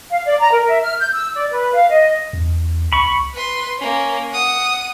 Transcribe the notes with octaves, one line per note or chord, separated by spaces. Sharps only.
F5
D5
A#5
A#4
E5
F6
G6
E6
D5
B4
F5
D#5
E2
C2 B5 C#6
B4 C6
A#3 C#4
F#5 D#6